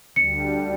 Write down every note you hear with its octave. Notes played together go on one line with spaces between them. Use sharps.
D2 D3 G3 C#7